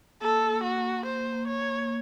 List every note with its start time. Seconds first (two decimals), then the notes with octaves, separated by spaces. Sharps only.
0.21 A#3 A4
0.50 A#3
0.63 F#4
0.77 A#3
1.06 A#3 C5
1.33 A#3
1.48 C#5
1.61 A#3